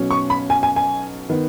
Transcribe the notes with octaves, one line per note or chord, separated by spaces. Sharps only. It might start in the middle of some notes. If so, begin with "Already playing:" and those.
Already playing: B1 B2 F#3 C#4
C#6
B5
G#5
G#5
G#5
D#3 B3